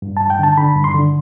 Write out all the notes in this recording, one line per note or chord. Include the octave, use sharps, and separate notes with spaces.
G2
G2 A5
G5
D3 A5
D3 B5
G2
C6
D3